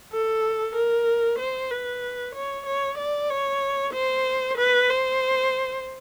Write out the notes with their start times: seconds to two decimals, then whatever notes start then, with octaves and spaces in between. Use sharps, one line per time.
0.13 A4
0.75 A#4
1.39 C5
1.71 B4
2.35 C#5
2.66 C#5
2.98 D5
3.30 C#5
3.94 C5
4.58 B4
4.89 C5